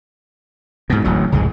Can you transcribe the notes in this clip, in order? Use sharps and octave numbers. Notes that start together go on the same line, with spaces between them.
G#2 B2
D1 A1 F#3
F1 C#2 G#2 G#3